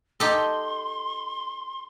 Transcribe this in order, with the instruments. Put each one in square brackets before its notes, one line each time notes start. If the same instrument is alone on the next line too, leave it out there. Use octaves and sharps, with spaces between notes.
[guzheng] D#4 G4 A4 [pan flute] C6